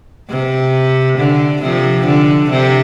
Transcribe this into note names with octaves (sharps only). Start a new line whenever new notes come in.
C3
D3
C3 F3
D3
C3